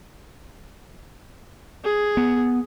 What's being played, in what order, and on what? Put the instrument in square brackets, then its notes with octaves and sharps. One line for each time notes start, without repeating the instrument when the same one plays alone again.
[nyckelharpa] G#4
[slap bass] B3